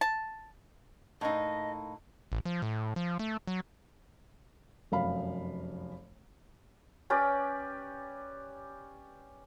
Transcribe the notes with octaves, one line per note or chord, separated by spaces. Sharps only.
A5
A2 A#3 D#4 D#5
A1
F3
A2
F3
A3
F#3
F1 F#2 F5 B5
C#4 G4 B4 D5